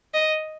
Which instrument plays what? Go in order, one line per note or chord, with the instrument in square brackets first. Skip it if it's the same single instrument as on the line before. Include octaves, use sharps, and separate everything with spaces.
[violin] D#5